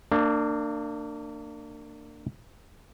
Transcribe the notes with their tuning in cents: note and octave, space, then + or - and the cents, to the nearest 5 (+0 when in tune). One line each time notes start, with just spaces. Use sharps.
A#3 -30 D4 +20